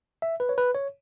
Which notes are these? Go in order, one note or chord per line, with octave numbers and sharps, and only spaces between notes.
E5
B4
C#5
B4
C#5